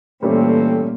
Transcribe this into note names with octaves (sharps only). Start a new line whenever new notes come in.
A#2 E3 G3 A3 C4 C#4 A4